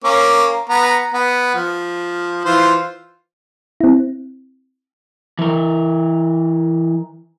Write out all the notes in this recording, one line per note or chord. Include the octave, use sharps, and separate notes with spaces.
A#3 C#4 D6
B3 A#5
B3
F3
E3 F4 C5
C4 E4
E3 A#4